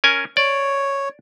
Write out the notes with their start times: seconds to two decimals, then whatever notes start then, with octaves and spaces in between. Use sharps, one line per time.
0.04 C#4 A#4 G#5
0.37 C#5 D5